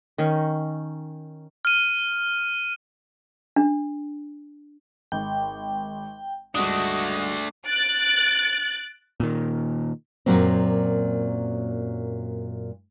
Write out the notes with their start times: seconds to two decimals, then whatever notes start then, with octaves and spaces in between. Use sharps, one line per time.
0.18 D#3 C#4
1.65 F6 D#7
3.56 D4
5.12 G#1 G5
6.55 C#2 G2 A3 D4 F#4 D#5 D#6
7.67 F#6 A6 D7
9.20 A#2 D#3
10.26 F#2 A#2 C#3 F#3 A#3 C4